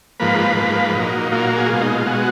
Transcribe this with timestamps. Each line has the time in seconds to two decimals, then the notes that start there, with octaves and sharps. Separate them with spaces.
0.20 G#2 F3 A#3 B4
0.57 G#2 F3 A#3
0.95 A#2 F#3 A#3 D#4
1.31 A#2 F#3 A#3 F4
1.56 G#4
1.69 B2 G#3 F4
1.81 D#4
1.94 F4
2.06 B2 G#3 F#4